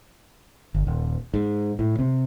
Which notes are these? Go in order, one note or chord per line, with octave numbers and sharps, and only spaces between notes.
G1
D#1
G#2
A2
C3